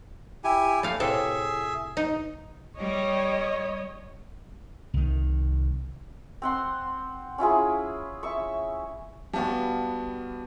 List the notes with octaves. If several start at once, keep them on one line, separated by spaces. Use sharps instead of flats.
E4 G4 G#5
A3 F5
A2 C3 G#4 A4 E5
D#4
G3 C#5 D#5
C2 D#3
C4 F#5 C6
C#4 E4 F4 G#4
E5 C#6
G3 B3 F#4 F5 A5